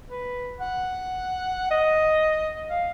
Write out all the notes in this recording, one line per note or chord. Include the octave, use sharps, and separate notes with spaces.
B4
F#5
D#5
F5